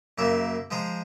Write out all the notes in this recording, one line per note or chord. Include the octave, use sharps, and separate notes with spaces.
F#2 C#3 A#3 E5
F3 G#3 C5 A#5